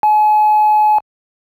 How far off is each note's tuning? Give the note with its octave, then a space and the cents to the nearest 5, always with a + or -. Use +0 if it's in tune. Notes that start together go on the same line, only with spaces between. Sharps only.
G#5 +40